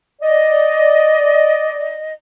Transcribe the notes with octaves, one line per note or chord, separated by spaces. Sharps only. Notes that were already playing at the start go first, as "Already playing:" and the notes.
D5 D#5